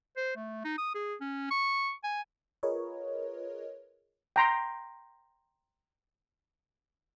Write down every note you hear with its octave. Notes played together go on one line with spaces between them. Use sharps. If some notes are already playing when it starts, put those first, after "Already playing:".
C5
A3
D#4
D#6
G#4
C#4
C#6
G#5
F4 G#4 A#4 B4 C#5 D#5
G5 A#5 C6